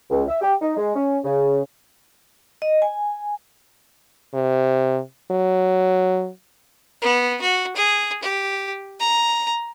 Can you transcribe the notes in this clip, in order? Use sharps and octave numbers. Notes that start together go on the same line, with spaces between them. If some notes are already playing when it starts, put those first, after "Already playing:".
C#2
E5
G4
D#4
G#3
C#4
C#3
D#5
G#5
C3
F#3
B3
F#4
G#4
G4
A#5